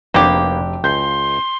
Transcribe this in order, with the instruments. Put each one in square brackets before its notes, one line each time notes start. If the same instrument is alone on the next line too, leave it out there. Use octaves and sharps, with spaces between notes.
[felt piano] F1 D4 [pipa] F#3 G4 [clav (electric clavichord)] A#3 B3 C5
[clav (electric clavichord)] C#2 [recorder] C6 [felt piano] G6